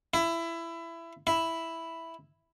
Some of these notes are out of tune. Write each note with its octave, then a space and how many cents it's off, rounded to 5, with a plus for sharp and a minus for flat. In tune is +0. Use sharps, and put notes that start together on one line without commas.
E4 +20
E4 +0